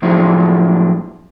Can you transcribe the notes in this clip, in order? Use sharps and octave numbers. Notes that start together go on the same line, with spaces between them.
A2 F3 F#3 G#3 D4 E4